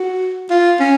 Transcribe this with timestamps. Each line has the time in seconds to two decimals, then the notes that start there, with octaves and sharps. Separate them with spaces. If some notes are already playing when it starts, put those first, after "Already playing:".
Already playing: F#4
0.50 F4
0.80 C#4